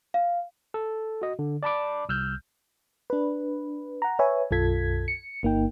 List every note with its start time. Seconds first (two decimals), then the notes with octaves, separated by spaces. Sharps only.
0.14 F5
0.74 A4
1.22 F#4 D#5
1.39 D3
1.63 D5 A5 B5 D6
2.09 C2 E6 F6 G6
3.10 D4 B4
4.02 F#5 A#5
4.19 B4 C#5 E5 G#5
4.51 B1 F#2 F4 A4 G#6 B6
5.08 C#7
5.43 G1 A#3 D#4 G5